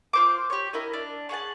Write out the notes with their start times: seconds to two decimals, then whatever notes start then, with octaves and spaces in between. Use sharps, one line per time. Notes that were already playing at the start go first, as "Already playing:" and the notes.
0.13 F4 C5 D6
0.50 G4 C#5
0.73 E4 A#4 D#5
0.93 D4
1.29 C#4 G#4 F#5 A5